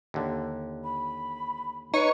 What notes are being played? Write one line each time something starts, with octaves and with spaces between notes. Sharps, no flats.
D#2 D3
B5
D#4 B4 C#5